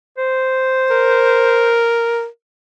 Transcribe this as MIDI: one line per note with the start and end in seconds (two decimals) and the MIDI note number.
0.18 1.83 72
0.90 2.26 70